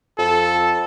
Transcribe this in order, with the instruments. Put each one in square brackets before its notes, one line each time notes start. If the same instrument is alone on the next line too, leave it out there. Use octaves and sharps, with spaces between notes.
[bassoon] F2 [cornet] A4